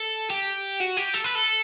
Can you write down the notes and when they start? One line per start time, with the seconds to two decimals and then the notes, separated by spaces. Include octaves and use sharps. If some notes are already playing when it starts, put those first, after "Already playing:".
Already playing: A4
0.30 G4
0.80 F#4
0.97 G4
1.14 A4
1.24 B4
1.35 A4